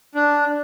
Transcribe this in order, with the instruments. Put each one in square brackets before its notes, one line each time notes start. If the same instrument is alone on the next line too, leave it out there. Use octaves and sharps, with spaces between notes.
[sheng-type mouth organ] D4